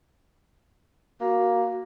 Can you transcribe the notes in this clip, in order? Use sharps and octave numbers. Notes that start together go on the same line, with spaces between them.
A#3 F#4